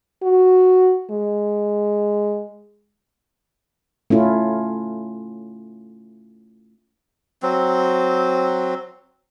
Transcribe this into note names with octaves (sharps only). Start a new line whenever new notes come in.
F#4
G#3
A3 C#4 E4 F4
F#3 C4